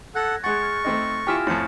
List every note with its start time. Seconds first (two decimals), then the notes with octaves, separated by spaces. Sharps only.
0.15 A4 F#5 F#6 G#6 A#6
0.44 G#3 F#5 C#6 A6
0.63 F6
0.84 A3 C4 D#4 A#6
1.27 E4 F4 G4 G#5 F6 E7
1.47 F2 A2 C#6 C#7